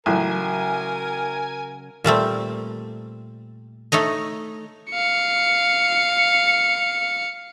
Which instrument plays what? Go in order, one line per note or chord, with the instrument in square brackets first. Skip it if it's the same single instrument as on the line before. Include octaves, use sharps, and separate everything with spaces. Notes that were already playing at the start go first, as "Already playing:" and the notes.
[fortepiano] A1 [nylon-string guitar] C#3 F#3 F4 [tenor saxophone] A#4 [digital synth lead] G#5
[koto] A#2 G3 A3 C4
A3 D#4 C#5 D#5
[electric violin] F5 C#7